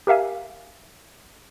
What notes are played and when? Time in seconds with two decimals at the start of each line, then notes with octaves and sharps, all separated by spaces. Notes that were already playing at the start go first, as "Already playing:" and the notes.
0.07 G4 A#4 E5 F5 G#5